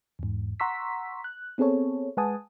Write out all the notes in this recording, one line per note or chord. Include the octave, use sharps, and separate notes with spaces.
E2 G#2
F#5 A#5 C6 C#6 E6 B6
F#6
B3 C4 G#4 A4 C#5
G#3 B4 F#5 G#5 A5 D#6